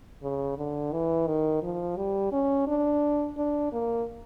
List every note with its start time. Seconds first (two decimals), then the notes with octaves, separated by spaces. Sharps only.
0.23 C#3
0.58 D3
0.92 E3
1.27 D#3
1.63 F3
1.97 G3
2.32 C#4
2.67 D4
3.37 D4
3.72 A#3